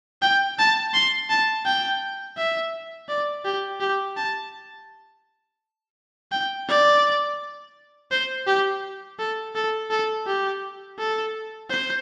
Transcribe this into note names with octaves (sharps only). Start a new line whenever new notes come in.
G5
A5
C6
A5
G5
E5
D5
G4
G4
A5
G5
D5
C5
G4
A4
A4
A4
G4
A4
C5